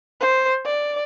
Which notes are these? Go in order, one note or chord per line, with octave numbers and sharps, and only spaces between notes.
C5
D5